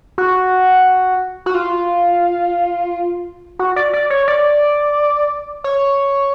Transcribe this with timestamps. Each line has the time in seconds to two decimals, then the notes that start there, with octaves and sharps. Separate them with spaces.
0.18 F#4
1.46 F#4
1.54 F4
3.59 F#4
3.76 D5
3.93 D5
4.10 C#5
4.28 D5
5.64 C#5